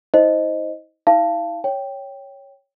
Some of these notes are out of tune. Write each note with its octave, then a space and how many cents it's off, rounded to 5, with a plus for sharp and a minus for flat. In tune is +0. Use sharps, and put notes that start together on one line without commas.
E4 -40 C5 +0 D#5 +0
E4 -40 F5 -25 A5 +0
C#5 +0 G5 +0